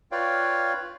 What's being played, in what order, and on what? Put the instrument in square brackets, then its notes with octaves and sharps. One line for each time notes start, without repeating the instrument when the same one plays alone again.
[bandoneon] F4 B4 C#5 D5 F5 G5